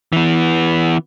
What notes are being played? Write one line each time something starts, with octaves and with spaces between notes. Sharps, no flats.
E3 B3